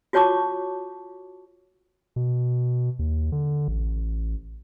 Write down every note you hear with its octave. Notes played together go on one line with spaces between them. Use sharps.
F4 F#4 C#5 A5 C#6 D6
B2
D#2
D3
A1